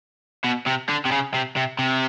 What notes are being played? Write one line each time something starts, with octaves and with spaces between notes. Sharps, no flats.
B2
C3
D3
C3
C#3
C3
C3
C3